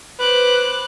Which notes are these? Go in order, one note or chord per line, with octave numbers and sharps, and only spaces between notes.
B4 C5 D6 F#6